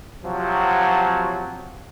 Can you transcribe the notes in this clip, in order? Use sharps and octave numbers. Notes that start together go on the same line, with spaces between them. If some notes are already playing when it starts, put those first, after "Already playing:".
C3 F3 F#3